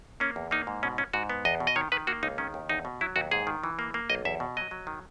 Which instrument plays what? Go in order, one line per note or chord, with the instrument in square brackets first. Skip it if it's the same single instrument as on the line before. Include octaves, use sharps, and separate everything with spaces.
[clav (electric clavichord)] A#3 C#4
E2
A#3 D#4
G#2
B2 C#4
C#4
G#2 F#4
B3
E2 D#5
B2
D#5
D#3 C#5
D#3 B4
A#3 F#4
C#2 D#4
D#3 C#4
D#2
E2 D#4
B2
F#3 E4
D#2 F#4
G#2 G#4
D#3
E3
A#3
A#3
B1 D#5
E2 E5
B2
F#3 D#5
F#3
D#3